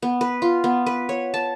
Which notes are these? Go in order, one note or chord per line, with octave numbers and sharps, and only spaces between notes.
B3
B4
F4
B3
B4
C#5
A5